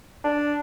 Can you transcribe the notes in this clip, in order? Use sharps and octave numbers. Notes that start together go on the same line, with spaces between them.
D4